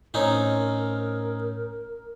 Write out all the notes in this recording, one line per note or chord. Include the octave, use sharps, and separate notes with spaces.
A2 C4 C#4 D#4 A#4